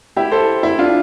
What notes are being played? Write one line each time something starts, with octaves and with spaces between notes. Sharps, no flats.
E4 G4
A4 C5
E4
D4 F4